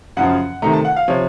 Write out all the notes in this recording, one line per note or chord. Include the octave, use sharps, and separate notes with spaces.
F#2 C#3 F3 F#5
C3 D#3 A3 A#5
A5
F#5
F5
C3 F3 C#5